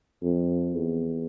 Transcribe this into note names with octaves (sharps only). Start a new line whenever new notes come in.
F2
E2